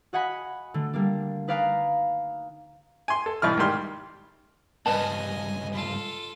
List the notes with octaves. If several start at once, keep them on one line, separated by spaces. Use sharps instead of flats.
F#4 D#5 F#5 G#5 B5
D3 A3
G3 A#3 D4
D#4 B4 D5 F5 G#5 A#5
G#5 C6
A4
C2 B2 E3 F6
G#2 D#3 G3 C6 F6
C#2 G2 B4 D5 D#5 G#5 A5
F4 A4